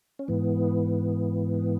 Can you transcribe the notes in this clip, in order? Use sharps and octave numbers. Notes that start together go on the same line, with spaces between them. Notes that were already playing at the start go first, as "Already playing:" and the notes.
C#4
G#2 E3 B3